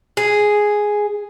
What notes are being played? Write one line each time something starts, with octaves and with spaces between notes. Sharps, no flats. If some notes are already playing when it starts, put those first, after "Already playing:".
G#4